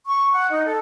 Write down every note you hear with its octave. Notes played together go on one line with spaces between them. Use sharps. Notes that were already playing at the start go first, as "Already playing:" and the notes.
C#6
F#5
D#4
A4